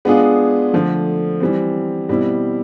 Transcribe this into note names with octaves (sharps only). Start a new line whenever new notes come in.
G#3 B3 D4 F4 G#4
D3 F3 A3
E3 G3 C4
B2 G3 C4 E4